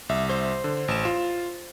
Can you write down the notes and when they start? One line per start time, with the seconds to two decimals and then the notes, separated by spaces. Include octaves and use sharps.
0.09 C2 E5
0.29 C5
0.64 D3
0.88 A1 E7
1.05 F4